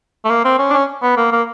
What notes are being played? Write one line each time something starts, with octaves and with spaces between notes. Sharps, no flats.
A3
A#3
C4
C#4
D4
C#4
B3
A#3
A#3